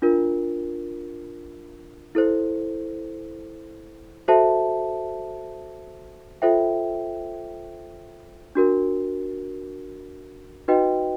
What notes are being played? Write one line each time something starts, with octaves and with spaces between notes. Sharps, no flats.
D4 F4 A#4
E4 A4 C5
F#4 A4 C5 E5 A5
F4 A4 C5 E5 G5
D4 F#4 A#4
D#4 F#4 B4 D#5 G5